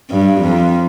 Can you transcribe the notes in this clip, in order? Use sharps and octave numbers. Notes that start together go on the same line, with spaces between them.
G2
F2